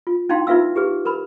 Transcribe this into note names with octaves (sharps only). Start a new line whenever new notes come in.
F4
C#4 D#4 E4 F5 G5 C6
D#4 F4 B4 E5 F5 E6
G4 G#4 B4
A#4 B4 B5